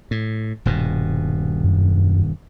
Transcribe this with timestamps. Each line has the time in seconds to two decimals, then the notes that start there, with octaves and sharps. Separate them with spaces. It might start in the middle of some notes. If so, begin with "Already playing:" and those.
0.11 A2
0.66 D#1 G2 B2
1.64 F#2